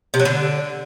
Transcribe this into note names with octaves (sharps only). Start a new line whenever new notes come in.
C3
F#3
D3